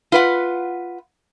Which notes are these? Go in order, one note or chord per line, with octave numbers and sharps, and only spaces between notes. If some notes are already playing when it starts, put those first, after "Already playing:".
F4 B4 F#5